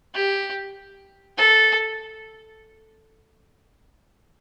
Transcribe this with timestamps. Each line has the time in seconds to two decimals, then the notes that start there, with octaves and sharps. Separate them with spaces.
0.14 G4
1.38 A4